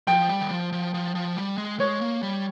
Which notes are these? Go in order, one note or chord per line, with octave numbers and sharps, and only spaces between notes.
F3 G5
G3
D#3
F3
F3
F3
F3
G3
G#3
G#3 C#5
A#3
G3